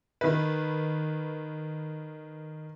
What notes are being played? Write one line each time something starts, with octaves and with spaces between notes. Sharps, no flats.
D#3 B4